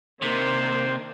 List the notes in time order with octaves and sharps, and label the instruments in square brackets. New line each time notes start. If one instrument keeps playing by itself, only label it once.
[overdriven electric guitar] C3 [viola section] D#3 A#3 D4 [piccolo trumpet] C5